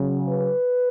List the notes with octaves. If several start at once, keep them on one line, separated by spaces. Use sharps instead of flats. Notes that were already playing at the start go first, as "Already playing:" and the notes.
Already playing: C#3 F#3
B4